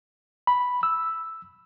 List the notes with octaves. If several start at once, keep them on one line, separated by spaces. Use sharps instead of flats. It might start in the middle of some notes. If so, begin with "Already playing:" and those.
B5
E6